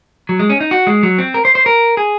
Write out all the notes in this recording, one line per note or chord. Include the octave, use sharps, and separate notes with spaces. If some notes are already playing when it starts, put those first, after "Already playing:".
F#3
G#3
C#4
D#4
F#4
G#3
F#3
C4
A#4
C5
C5
A#4
G#4